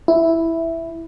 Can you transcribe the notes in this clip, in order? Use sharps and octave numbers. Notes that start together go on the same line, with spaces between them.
E4